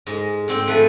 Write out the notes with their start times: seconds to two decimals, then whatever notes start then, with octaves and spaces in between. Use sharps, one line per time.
0.07 G#2 G#3
0.48 G#2 C4 G5
0.67 F3 A3 B4